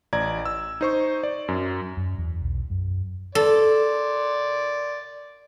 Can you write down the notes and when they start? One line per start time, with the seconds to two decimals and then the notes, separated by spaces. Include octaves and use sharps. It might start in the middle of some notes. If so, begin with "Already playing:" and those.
0.13 A1 D5 A#5 G#6
0.45 E6
0.81 D#4 C5 C#6
1.23 D5
1.48 F#2
1.97 F#2
2.18 E2
2.42 B1
2.70 F#2
3.35 A4 D5 C6